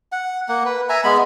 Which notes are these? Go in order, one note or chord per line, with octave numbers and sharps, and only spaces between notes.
F#5
A#3 F#5
B4
E5 G#5 A#5
G#3 B3 B5